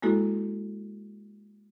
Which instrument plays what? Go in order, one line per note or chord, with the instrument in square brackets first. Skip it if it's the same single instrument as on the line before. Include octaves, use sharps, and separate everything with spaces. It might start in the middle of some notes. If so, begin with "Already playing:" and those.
[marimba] G#3 A#3 E4 F#4 A4